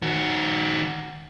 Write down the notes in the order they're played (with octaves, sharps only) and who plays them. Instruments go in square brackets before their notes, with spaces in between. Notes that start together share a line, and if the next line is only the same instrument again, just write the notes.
[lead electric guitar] D#3 F#4